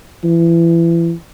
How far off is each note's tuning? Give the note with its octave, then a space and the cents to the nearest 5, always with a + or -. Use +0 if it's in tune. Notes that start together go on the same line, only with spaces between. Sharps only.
E3 +30